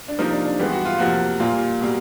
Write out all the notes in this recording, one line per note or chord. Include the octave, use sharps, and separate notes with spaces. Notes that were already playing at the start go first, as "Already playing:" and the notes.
D4
C3 F3 A#3 D#4
D4
D4
G2 E3 G#3 B3 G4
F#4
F4
F2 C3 F3 A#3 F#4
A#2 G3 A#3 F4
B2 G3 A#3